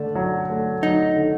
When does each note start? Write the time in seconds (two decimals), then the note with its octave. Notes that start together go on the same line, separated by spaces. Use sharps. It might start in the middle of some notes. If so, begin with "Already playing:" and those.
Already playing: D3 A3 D4
0.15 F#3
0.50 A3
0.83 F#3 D#4
1.16 D3